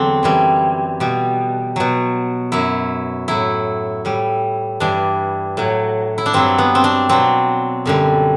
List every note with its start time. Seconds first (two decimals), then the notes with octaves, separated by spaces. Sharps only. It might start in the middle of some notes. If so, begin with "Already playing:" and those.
Already playing: E2 D3 F#3 C4 D4
0.23 F#2 E3 G3
1.00 B2 G3
1.76 B2 F#3
2.52 F#2 F#3 E4
3.28 A2 F#3 E4
4.05 A2 G3
4.80 G2 E3 G3 D4
5.57 A2 F#3
6.18 E4
6.26 D4
6.33 G2 F#3 C4
6.58 B3
6.75 C4
6.84 D4
7.09 B2 F#3 C4
7.86 F#2 D3 G3